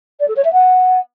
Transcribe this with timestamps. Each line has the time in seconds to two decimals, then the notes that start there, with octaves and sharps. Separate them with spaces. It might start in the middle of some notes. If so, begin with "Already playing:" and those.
0.19 D5
0.28 A4
0.36 C#5
0.44 E5
0.52 F#5